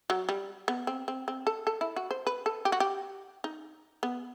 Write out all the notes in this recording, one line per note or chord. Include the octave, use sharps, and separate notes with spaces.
F#3
G3
B3
C4
C4
C4
A4
A4
E4
F#4
C5
B4
A4
G4
F#4
G4
D#4
B3